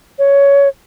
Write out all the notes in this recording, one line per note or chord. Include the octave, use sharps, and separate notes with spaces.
C#5